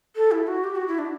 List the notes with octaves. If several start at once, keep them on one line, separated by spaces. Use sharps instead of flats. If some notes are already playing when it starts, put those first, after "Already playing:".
A4
E4
F#4
G4
F#4
E4
D4